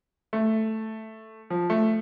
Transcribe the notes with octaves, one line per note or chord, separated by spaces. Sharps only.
A3
F3
A3